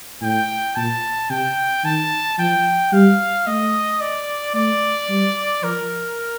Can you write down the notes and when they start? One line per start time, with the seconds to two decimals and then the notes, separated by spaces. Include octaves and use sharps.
0.21 A2 G5
0.76 A#2 A5
1.30 C3 G5
1.84 D#3 A5
2.38 F3 G5
2.92 G3 F5
3.46 A3 D#5
4.01 D5
4.54 A3 D5
5.09 G3
5.62 F3 A#4